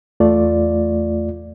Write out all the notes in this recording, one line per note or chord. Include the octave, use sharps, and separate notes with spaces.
E2 A3 F4 D5